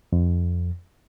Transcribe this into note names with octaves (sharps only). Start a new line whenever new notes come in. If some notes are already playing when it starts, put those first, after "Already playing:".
F2